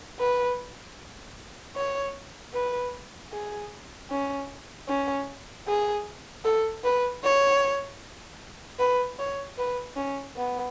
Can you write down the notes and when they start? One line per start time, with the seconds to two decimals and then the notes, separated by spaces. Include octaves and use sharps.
0.19 B4
1.75 C#5
2.54 B4
3.32 G#4
4.10 C#4
4.88 C#4
5.67 G#4
6.45 A4
6.84 B4
7.24 C#5
8.79 B4
9.19 C#5
9.58 B4
9.97 C#4
10.36 B3